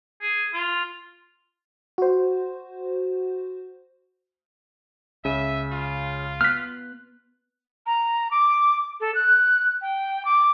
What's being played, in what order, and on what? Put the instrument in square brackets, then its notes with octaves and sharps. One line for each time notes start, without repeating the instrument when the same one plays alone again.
[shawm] G#4
F4
[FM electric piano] F#4 C5
[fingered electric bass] C#2 [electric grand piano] C#3 D#7 [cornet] E5
[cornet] F4
[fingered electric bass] B3 [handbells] F6 B6 [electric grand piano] F#6
[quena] A#5
D6
A4
F#6
G5
D6